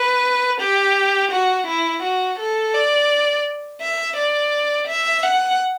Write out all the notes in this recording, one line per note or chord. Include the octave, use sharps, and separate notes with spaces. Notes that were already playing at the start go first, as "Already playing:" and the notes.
Already playing: B4
G4
F#4
E4
F#4
A4
D5
E5
D5
E5
F#5